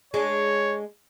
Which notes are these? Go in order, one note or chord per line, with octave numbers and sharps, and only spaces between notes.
G#3 D4 C#5